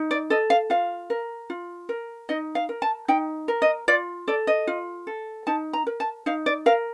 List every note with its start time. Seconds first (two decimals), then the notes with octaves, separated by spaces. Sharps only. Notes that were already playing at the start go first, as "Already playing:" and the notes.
Already playing: D#4
0.11 D5
0.30 A4 D#5
0.50 F5
0.70 F4 F5
1.10 A#4
1.50 F4
1.89 A#4
2.29 D#4 D#5
2.55 F5
2.69 A#4
2.82 A5
3.08 D#4 G5
3.48 A#4
3.62 D#5
3.88 F4 D5
4.28 A4 D5
4.47 D#5
4.67 F4
5.07 A4
5.47 D#4 A5
5.73 A#5
5.87 A#4
6.00 A5
6.26 D#4 F5
6.46 D5
6.66 A#4 F5